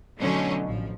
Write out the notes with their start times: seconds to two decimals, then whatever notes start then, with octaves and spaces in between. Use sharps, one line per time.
0.17 B2 D3 F#3 A3 C#4 D#4
0.66 A1 F3